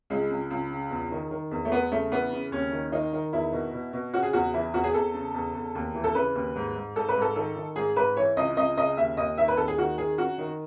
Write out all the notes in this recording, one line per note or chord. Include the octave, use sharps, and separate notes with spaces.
C#2 G#3
C#2
C#2
C#3
E2
D#3
D#3
E2
A3
E2 B3
C#3 A3
E3 B3
C#3
D#2 C#4
D#3
D#3 D#4
D#3
E2 E4
B2
B2
B2
C#3 F#4
G#4
E2 F#4
E3 E4
E2 F#4
G#4
E2 A4
C#3
E2
E2
D#2
E3
A4
C#3 B4
D#2
G#2
G#2
G#2 A4
B4
G#2
A4
D#3 A4
D#3
G#2 G#4
G#2 B4
E3 C#5
C#2 D#5
C#2 D#5
C#3 D#5
D#2 E5
D#2 D#5
D#3 E5
B4
D#2 A4
G#4
D#3 F#4
D#3 G#4
F#2 F#4
D#3